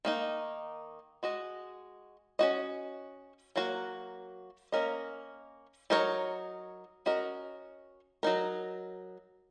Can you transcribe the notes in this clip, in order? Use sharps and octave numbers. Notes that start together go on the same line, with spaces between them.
D#3 A#3 D#4
G#3 F#4 D#5
C#4 F#4 D#5
F#3 A#3 F#4 A#4
A#3 C#4 A#4 D#5
F#3 D#4 A#4 C#5
C#4 F#4 A#4 D#5
F#3 D#4 A#4